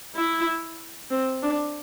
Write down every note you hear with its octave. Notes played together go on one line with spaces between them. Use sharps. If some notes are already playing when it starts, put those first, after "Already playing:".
E4
C4
D4